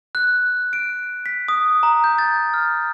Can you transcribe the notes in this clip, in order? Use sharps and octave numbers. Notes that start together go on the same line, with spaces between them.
F#6
D7
B6
D#6
A#5
G6
A6
F6